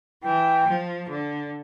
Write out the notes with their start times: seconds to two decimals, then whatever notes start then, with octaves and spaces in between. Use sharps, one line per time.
0.23 E3 G5
0.67 F3
1.10 D3